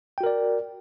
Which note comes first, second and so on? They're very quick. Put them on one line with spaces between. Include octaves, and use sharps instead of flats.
G5 F#4 A#4 D5